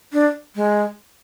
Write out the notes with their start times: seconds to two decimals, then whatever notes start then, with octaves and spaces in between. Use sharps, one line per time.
0.13 D4
0.56 G#3